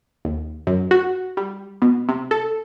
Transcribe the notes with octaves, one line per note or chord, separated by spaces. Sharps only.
D#2
F#2
F#4
G3
B2
C3
A4